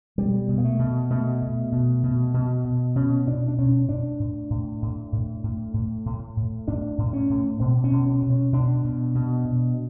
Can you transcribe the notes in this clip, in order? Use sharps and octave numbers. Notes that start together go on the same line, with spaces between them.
B2 G3
B2
A#3
A3
B2
B2 A3
B2
B2
B2
B2
B2
B2 C#4
B2 D4
D4
B2 C#4
A2 D4
A2
A2
A2
A2
A2
A2
A2
A2
A2 D4
A2
C#4
A2
B2 C4
C#4
B2
C#4
B2
C#4
B2 D4
B2
B2
B2